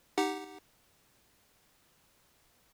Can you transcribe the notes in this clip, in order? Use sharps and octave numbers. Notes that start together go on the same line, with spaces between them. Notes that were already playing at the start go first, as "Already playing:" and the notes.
D#4 G4 F#5